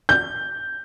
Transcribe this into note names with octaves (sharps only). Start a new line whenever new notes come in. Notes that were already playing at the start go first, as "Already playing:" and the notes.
G6